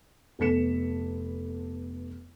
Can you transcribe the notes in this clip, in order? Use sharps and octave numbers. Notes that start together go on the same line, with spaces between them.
F1 B3 A4 B6 C#7 E7